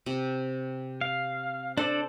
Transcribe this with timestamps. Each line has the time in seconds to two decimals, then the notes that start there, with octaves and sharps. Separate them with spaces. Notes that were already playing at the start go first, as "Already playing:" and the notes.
0.06 C3
1.01 F5
1.77 D4 A4 C5 D5